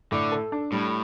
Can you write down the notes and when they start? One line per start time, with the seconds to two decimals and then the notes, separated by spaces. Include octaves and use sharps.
0.12 A2 D3
0.32 A4
0.52 D4
0.72 A2 G3